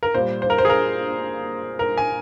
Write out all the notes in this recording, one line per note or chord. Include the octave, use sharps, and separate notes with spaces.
A#4
A#2 G3 C5
C5
A#4
C5
G#4
A#4
A#4
G#5